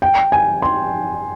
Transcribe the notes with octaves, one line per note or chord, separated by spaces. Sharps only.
G5
G#5
C6